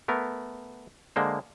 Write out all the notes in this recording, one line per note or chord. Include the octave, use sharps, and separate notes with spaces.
A3 B3 A#4
D3 G#3 A#3 C5